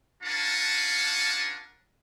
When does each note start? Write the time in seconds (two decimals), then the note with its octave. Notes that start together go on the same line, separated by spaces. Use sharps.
0.22 C#4 D4 F4 A#4 F#5 A5